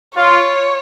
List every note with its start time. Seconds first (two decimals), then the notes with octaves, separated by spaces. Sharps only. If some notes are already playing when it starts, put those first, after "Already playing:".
0.16 F4 C#5